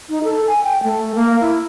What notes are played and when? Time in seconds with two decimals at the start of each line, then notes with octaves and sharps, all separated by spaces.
0.10 D#4
0.24 A4
0.47 G#5
0.64 G5
0.83 A3
1.15 A#3
1.41 E4